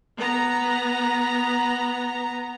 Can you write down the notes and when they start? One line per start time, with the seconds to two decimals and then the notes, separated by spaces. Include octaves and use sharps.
0.17 B3 A#5